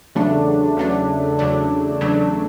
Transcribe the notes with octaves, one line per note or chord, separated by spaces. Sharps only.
E2 C#3 F#3 A3 D4
E2 C#3 F#3 A3 D4
E2 C#3 F#3 A3 D4
E2 C#3 F#3 A3 D4